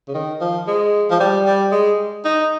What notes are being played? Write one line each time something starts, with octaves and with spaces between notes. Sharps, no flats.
C#3
D#3
F3
G#3
F3
G3
G3
G#3
D#4